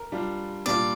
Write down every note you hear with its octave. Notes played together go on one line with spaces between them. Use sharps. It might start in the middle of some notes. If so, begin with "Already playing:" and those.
Already playing: A#4
G3 D4 F4
A#2 G3 D4 F4 D5